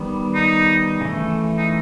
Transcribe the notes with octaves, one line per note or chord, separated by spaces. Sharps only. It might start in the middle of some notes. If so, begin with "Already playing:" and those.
Already playing: D#3 G3 B3
D#4
C#3 E3 A3
D#4